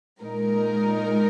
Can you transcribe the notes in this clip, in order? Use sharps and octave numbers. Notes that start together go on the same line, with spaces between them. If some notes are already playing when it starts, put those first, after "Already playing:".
A#2 G#3 D#4 A#4